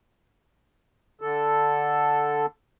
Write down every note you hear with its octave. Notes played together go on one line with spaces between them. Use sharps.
D3 A4